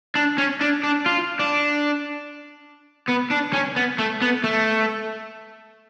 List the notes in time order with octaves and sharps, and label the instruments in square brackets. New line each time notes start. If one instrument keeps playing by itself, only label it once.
[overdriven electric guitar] D4
C#4
D4
D4
F4
D4
B3
D4
C#4
B3
A3
B3
A3